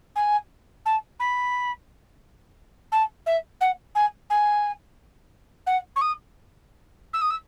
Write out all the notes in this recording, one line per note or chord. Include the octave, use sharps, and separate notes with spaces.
G#5
A5
B5
A5
E5
F#5
G#5
G#5
F#5
C#6
D#6
E6
D#6
E6